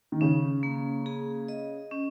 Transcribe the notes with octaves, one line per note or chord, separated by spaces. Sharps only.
D#3
C#3 C#4
A#3
G#4
D#5
C#4